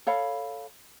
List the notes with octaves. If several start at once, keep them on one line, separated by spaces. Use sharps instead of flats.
A4 C#5 F5 B5